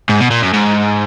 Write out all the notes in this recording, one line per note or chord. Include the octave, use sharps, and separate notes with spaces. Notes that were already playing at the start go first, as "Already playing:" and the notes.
G#2
B2
A#2
F#2
G#2